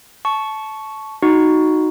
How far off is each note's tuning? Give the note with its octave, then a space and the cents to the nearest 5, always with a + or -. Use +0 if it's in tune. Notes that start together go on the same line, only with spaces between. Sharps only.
A5 -15 C#6 +5
D#4 +0 F#4 +0